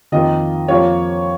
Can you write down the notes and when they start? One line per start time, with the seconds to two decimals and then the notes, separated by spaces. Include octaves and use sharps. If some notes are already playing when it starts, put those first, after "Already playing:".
0.12 F2 D#3 A#3 F4 D#5
0.68 F2 F3 A#3 F4 C#5